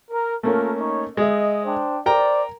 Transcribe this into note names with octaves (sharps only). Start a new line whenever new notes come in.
A#4
A3 A#3 C#4 F4 A4 A#4
D#4 C#5
G#3 D#5 E5
D4 C5 G5
A#4 C5 D5 G5 A#5